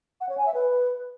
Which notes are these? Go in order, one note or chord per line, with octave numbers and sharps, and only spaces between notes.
F#5
C#5
G#5
E5
B4